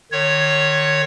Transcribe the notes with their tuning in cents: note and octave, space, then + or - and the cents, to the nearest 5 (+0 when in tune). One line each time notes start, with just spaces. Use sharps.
D#3 -40 C#5 +0